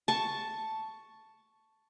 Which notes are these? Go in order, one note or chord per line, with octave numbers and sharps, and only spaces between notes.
A5 C#6